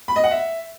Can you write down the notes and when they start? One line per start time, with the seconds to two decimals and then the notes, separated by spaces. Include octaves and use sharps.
0.08 B5
0.16 D#5
0.24 F#5
0.31 E5